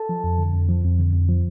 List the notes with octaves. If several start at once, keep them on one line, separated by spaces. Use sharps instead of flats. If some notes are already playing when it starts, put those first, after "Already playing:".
Already playing: A4 A5
F3
F2
D3
F2
F3
F2
D3
F2
F3